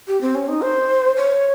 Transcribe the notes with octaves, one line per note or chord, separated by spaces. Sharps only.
G4
C4
C#4
D#4
C5
C#5